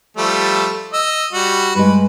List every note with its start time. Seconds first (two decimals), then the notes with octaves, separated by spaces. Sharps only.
0.17 F3 G3 A3
0.93 D#5 E6
1.33 G3 F#4
1.75 G2 G#3 B4